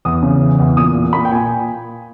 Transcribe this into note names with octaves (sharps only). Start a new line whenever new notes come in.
E2 D#6
C#3
E3
E2
A#2 D#6
A#2
A#2 B5
G5
A#2 G#5